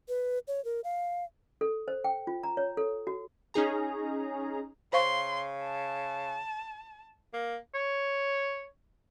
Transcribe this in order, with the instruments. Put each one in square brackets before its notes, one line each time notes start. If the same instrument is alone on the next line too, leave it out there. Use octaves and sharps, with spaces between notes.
[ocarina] B4
C#5
A#4
F5
[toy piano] A4
C5
G5
F4
A#5
C#5
A4
F#4
[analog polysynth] C#4 D#4 G#4 A#5
[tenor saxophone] C#3 [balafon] C5 F5 C#6 [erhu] C6
[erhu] A5
[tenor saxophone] A#3
[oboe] C#5